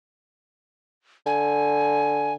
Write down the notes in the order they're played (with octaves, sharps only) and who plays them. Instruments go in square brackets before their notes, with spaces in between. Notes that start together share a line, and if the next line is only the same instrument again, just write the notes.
[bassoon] D3 [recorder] G#5